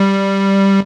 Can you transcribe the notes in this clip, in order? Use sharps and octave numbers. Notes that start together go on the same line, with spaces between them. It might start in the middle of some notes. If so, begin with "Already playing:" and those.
Already playing: G3